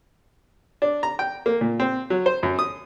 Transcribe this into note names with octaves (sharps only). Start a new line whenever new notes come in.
D4
A#5
G5
A#3
A#2
C4
F#3
C5
F#2
D#6